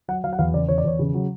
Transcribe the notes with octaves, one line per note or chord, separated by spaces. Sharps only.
F#3 F#5
F#3 F5
F#5
E2 F5
C#3 D5
E2 C#5
D5
E2 C#5
C#3
F#3